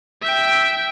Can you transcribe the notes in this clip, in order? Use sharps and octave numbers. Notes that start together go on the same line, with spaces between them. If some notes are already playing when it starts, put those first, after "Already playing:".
E5 G5